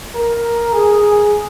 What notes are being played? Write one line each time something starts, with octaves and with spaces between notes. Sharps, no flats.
A#4
G#4